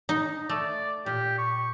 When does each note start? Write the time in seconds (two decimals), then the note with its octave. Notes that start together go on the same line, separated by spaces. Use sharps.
0.09 D#4
0.49 A3 D5
1.06 A#2 G4
1.39 C#6